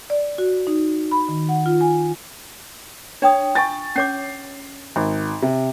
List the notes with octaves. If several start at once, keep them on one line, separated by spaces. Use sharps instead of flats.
D5
F#4
D#4
B5
D#3
F#5
F4
G#5
D4 C#5 G5 D#6
F4 G5 G#5 C#6 A6
C#4 C#5 D6 C7
G#1
C3